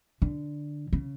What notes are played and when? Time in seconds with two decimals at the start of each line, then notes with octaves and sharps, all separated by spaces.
0.22 D3
0.93 C#3